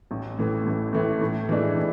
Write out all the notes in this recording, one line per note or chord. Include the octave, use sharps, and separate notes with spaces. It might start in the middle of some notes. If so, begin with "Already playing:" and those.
A1
A2 E3 A3
A1
A2 E3 A3
A2
E3 G#3 D4
A2